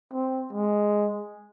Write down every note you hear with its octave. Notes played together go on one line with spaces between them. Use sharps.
C4
G#3